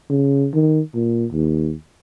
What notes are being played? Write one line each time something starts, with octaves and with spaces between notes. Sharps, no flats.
C#3
D#3
A#2
D#2